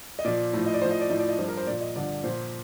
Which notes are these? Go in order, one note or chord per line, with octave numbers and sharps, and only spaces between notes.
D#5
A#2 F3 D5
A2 F3
D#5
D5
A2 F3 C5
D#5
D5
A2 F3 D#5
D5
D#5
G2 F3 C5
A#4
C5
A#2 F3 D5
D#5
G2 D3 F3 D5
A#2 F3 C5